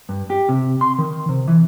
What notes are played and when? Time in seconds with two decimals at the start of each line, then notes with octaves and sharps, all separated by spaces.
0.09 G2
0.30 G4
0.49 C3
0.81 C6
0.98 D#3
1.29 C3
1.48 E3